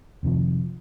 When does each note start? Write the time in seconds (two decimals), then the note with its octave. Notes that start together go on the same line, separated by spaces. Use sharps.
0.23 F1 C3 D#3 F3